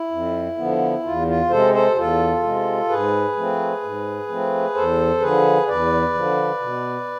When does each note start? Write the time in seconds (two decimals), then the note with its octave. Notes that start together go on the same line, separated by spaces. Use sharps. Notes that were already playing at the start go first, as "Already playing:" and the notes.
Already playing: E4
0.11 F2
0.58 D3 F3 B3
1.04 E2 F4
1.27 F4
1.50 C3 G#3 A4 C5
1.73 A4 C5
1.96 E2 F4 A4
2.43 C3 G#3
2.89 G#2 G#4 B4
3.36 F3 A3 C4
3.83 G#2
4.28 F3 A3 C4
4.74 E2 A4 C5
5.21 D3 F3 G#4 B4
5.68 E2 B4 D5
6.14 D3 F3
6.60 B2